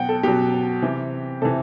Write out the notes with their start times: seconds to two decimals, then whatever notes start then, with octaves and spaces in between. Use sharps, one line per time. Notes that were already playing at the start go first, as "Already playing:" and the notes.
Already playing: B2 F#3 F#5 G5
0.09 A4
0.23 B2 F#3 G4
0.82 C3 E3
1.42 C3 E3 A4